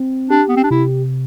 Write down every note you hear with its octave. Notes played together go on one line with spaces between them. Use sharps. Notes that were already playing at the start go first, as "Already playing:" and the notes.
Already playing: C4
D4 G4
B3
C4
D4
C3 E4